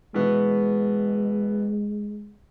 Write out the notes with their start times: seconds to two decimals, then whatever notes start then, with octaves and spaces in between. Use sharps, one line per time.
0.14 B2 E3 G#3 B3